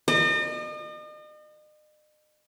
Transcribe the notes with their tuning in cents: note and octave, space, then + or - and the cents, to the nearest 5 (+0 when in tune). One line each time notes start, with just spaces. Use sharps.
D#5 -40